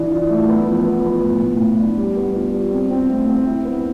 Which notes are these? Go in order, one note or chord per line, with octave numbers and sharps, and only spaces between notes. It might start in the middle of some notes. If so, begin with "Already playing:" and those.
Already playing: E3 D4
F4
A3
B3
F3
B3
B3
A2
A2
A2
D4
G3
B3
F4
G3
C4
C4
A3
C4
E4
B3